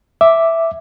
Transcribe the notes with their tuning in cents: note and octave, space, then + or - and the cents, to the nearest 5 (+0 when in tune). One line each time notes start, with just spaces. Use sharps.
E5 +0 D6 +0